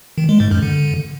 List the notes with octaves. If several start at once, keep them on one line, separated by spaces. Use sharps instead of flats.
D#3
G#3
G#2
F#2
D3